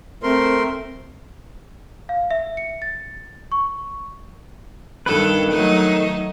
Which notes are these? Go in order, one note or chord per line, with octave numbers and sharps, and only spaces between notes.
A3 C4 A#4 C6
F5
E5
C#7
A6
C#6
G2 D#3 A4 B4
F#3 A3 D#4